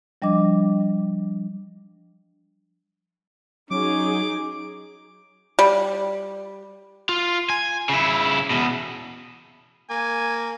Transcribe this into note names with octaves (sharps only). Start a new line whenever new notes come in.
F3 G3 D4 D#5 D6
F#3 C#4 D#4 G#4 D6
G3
F4
G#5
C#3 E4
E2 B2
A#3 G#5